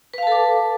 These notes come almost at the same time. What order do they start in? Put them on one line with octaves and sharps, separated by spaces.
B4 F5 A5 A4 D6